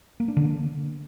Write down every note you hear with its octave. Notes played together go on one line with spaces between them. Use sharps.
A#3
D4
D3
A#3